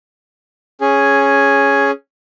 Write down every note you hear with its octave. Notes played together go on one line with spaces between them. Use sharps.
C#4 G#4